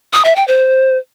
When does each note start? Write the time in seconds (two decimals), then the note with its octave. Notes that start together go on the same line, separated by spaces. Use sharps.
0.13 D#6
0.25 E5
0.36 G5
0.48 C5